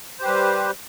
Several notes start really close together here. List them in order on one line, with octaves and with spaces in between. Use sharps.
C5 G4 B4 G3